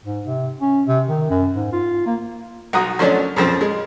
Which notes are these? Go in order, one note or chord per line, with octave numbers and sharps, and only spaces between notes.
G#2
C3
C#4
C3
D#3
F#2
G#2
F4
A#3
B1 F#4 A#5 D#6
F3 F#3 A3 C#4 D4
F2 C#3 F3 C4
G#3